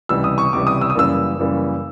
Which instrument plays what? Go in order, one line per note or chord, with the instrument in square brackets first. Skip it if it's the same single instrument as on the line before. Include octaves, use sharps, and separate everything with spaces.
[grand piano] C#2 C3 E3 G3 [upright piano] E6
[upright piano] D#6
C#6
[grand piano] C#2 C3 E3 G3 [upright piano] D6
[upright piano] D#6
E6
D#6
[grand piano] F#2 C#3 E3 G3 A#3 [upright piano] E6
[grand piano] F#2 C#3 E3 G3 A#3